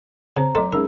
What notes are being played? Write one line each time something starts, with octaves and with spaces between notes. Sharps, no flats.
C#3 C4 C5 A#5
F#3 A3 A4 D#5 C6
G#3 C#4 D#4 G#4 A#4 E6